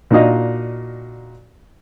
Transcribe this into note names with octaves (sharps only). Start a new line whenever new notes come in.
A#2 D4 D#4 F#4 D#5 F5